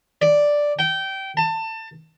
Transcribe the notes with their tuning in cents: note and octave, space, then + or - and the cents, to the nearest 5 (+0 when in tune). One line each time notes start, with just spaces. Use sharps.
D5 +0
G5 -20
A5 +25